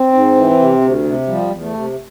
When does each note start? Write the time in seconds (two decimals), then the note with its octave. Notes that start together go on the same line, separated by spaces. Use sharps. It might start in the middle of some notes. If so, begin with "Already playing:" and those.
Already playing: C4
0.13 G#2
0.36 E3
0.59 C3
0.81 D2
1.04 C3
1.27 F3 G3
1.50 E2
1.62 A3
1.74 C3